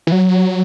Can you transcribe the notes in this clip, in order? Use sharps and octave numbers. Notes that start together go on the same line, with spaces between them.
E3
F#3